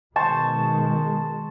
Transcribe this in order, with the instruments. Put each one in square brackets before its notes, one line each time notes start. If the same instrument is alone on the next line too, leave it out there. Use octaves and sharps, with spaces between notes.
[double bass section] B2 D#3 G#3 [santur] C5 A5 C#6